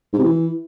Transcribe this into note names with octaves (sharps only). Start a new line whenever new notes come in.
G#2
C3
E3